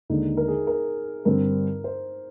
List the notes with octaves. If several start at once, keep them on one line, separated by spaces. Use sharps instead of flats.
D#2 D3 G#3 D#4
A#4
G#4
A#4
G2 D3 G3 C4 A#4
C5